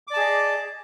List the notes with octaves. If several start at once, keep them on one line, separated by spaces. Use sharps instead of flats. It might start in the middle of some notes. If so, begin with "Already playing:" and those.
G#4 D5 D#5 A5 D6